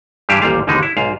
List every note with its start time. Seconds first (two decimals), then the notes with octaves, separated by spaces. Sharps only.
0.29 G2 E3 G3 E4 G4 F5
0.42 A1 D#2 A#2 G3 F5
0.67 A1 D#2 B2 D3 G#3 D#4
0.83 E4
0.97 B1 G#2 F5